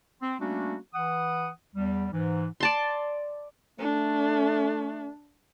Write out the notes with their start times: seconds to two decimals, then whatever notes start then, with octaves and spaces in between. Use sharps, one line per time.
0.21 C4
0.40 G3 A3 A#3 C#4 D4 F#4
0.94 E3 F#5 D#6
1.75 E2 G3
2.12 G#2 E3
2.60 D5 A5 C6
3.79 A3 D4